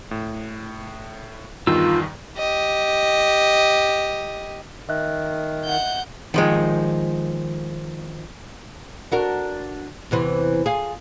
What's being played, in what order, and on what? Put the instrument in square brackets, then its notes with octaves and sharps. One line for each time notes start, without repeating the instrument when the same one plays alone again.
[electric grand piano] A2
[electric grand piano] E2 G2 D#3 [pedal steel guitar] F4 E6
[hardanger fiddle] G4 D#5
[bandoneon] D#3 [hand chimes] D#5 E5 F#6
[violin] F#5 G6
[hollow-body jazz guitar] D#3 F3 G#3
[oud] D4 F#4 A#4
E2 C3 E3
F4 G#4